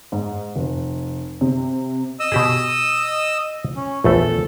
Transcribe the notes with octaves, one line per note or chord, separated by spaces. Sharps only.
G#2
F1
C3
D#5 D#6 E6
B2 G4 G#4
C#4
A#1 E2 A3 A4